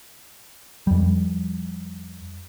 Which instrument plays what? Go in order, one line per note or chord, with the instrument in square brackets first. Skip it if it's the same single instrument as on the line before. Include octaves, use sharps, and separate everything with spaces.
[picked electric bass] F2 G3